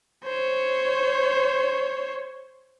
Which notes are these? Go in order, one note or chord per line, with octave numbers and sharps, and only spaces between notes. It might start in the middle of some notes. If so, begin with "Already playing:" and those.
C5 C#5